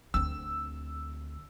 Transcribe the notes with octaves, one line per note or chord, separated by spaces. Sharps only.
D2 C4 E6